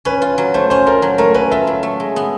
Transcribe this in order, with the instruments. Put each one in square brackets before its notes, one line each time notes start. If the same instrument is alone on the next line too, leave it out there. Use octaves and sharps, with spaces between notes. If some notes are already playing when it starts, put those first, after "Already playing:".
[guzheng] C#4 [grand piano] B4
[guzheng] F4
F#3
[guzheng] A3 [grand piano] C5
[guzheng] C#4 [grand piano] C5
[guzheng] F4 [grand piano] A#4
[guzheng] F#3
[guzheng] A3 [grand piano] A#4
[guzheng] C#4 [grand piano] B4
[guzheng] F4 [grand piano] E5
[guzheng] F#3
A3
G#3
B3